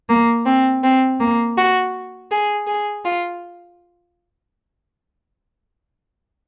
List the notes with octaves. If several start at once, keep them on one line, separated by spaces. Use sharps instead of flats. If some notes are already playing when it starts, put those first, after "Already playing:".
A#3
C4
C4
A#3
F#4
G#4
G#4
F4